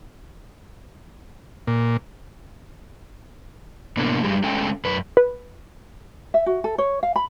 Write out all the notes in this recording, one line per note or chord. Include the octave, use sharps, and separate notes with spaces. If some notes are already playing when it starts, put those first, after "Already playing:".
A#2
A2 C3 A#3 B3 D4
G2 G3 G#3
G#3 A3 C#4 G5
F#2 B4
B4
E5
F#4
A4
C#5
F5
B5